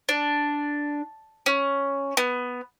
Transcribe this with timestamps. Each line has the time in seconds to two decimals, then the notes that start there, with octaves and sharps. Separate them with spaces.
0.09 D4
1.46 C#4
2.17 B3